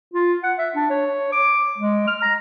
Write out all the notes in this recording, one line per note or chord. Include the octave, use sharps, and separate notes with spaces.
F4
F#5
E5
D4
C#5
D6
G#3
F6
A#5